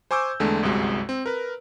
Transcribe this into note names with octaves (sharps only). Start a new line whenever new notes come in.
C5 G#5 C#6 D6 E6 G6
E2 D3 G#3 A3 D4
G1 C2 F#2 C3 G#3 F#4
C4
A#4 B4